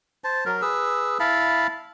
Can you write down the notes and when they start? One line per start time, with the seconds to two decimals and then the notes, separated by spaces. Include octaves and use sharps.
0.24 C5 A5
0.46 F#3 A#4
0.62 G#4 B4 E6
1.20 E4 F5 A5 B5